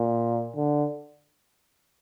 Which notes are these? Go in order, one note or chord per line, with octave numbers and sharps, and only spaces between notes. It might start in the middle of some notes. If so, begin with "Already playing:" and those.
Already playing: A#2
D3